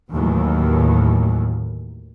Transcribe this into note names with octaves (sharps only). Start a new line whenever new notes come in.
D#2 A2 D#3 E3 F#3